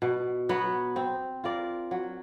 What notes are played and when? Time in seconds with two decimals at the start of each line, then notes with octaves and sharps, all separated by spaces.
0.02 B2
0.49 F#3 B3
0.96 C4
1.44 F4 A#4 D5
1.91 F#3